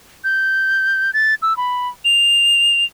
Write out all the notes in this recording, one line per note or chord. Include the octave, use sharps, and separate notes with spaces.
G6
A6
E6
B5
F7